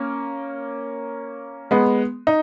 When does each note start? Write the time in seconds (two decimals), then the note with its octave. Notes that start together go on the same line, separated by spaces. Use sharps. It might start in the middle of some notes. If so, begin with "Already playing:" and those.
Already playing: A#3 C#4
1.71 G#3 B3
2.27 D#4